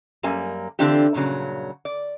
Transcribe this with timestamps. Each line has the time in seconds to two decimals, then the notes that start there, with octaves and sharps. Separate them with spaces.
0.23 F#2 G3 A#3 G#5
0.79 D3 E3 C4 D4 F4 G4
1.14 G2 A#2 C#3 F#3
1.85 D5